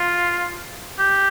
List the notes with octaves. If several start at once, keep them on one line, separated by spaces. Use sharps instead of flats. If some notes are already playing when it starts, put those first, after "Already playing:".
Already playing: F4
G4